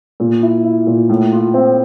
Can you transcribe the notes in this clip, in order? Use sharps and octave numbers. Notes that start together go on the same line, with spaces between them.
A#2
E4
E4
A#2
A2
F4
C4